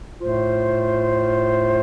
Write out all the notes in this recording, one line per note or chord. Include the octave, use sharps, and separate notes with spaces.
A2 A3 F4 C5